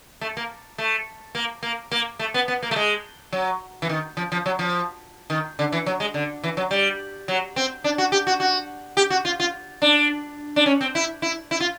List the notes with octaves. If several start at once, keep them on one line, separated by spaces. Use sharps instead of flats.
A3
A#3
A3
A#3
A#3
A#3
A3
B3
B3
A#3
A3
G#3
F#3
E3
D#3
F3
F3
F#3
F3
D#3
D3
E3
F#3
G#3
D3
E3
F#3
G3
F#3
C4
D4
F#4
G4
F#4
F#4
G4
F#4
F4
F4
D4
D4
C#4
C4
E4
E4
E4
F4